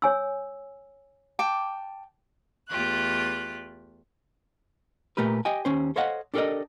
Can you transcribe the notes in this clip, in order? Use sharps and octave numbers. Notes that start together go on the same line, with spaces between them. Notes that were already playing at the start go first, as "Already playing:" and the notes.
C#5 G#5 E6
G5 A5 D6
E2 A3 F4 G4 F#6
A#2 A3 G4 A#4 B4
G4 D#5 G5 G#5
D#2 C#4 C5
A4 C5 C#5 D#5 F5 F#5
D4 G4 A4 A#4 D5 D#5